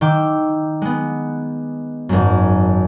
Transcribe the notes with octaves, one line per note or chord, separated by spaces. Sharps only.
D#3 G5 D6 E6
G#3 B3
G#1 F#2